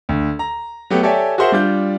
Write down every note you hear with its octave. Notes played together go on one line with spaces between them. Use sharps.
D2
A#5
F#3 A3 B3 G4
G4 A4 C#5 D5 E5 G#5
F#4 G#4 A#4 C5 E5 F#5
G3 D4 F4 G6